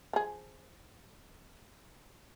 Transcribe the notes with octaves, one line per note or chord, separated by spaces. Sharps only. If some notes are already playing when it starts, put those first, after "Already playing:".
F3 G#4